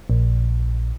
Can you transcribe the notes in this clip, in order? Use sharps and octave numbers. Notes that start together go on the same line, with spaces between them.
A#1